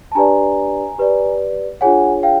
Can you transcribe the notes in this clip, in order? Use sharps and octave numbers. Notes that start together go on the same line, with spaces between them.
A5
D4 G4 B4 D5 G#5 A#5
G4 B4 D5
D4 F4 G#4 C#5 F#5 G#5
F5 G5